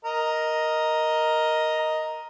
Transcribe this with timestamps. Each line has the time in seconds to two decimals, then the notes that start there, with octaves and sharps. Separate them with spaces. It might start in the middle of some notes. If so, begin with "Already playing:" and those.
0.05 A#4 D#5